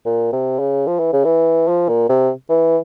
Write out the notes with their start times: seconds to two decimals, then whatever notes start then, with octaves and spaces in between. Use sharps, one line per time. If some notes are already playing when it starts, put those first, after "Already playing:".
0.05 A#2
0.33 C3
0.59 C#3
0.87 F3
0.99 E3
1.13 C#3
1.25 E3
1.68 F3
1.88 A#2
2.09 C3
2.49 E3